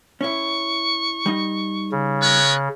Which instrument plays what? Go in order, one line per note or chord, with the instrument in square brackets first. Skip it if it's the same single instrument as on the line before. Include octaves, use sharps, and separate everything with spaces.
[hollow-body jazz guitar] C#4 E4 [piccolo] C#6
[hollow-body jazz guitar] G3 D#4 D#5
[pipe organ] C#3
[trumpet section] B3 A#4 C#5 [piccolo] F#6